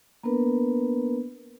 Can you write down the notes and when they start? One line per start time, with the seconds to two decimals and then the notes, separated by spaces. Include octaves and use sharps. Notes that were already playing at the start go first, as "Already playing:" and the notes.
0.23 A#3 B3 D4 A#4 B4